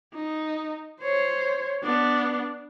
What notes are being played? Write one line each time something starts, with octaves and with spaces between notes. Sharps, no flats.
D#4
C5 C#5
B3 D4